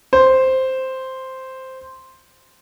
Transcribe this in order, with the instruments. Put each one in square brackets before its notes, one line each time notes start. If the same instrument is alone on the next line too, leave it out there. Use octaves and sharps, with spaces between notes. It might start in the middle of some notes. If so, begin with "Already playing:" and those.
[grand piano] C5